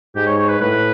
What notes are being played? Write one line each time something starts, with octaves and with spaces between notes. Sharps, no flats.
G#2 G4
C#5
C#5
B4
A2 B4